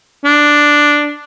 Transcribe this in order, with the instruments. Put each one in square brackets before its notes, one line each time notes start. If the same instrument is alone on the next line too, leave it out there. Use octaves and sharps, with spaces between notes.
[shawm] D4